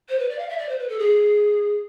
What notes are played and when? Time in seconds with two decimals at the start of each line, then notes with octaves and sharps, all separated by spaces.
0.09 C5
0.19 B4
0.29 D5
0.39 F5
0.49 E5
0.58 D5
0.69 C5
0.79 B4
0.89 A4
0.99 G#4